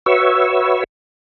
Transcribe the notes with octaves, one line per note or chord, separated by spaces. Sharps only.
F#4 B4 C#5 E5 C#6 E6